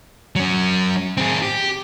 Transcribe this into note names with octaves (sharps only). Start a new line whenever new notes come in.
F#3 C#4
C4 G#4
G4